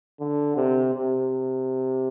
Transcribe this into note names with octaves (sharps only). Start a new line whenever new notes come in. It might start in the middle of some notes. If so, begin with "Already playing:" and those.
D3
C3
C3